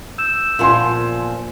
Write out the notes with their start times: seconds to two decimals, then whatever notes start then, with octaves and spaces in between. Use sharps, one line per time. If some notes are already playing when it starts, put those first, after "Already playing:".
0.18 E6 G6 E7
0.59 A#2 F3 B3 F4 G#5 C6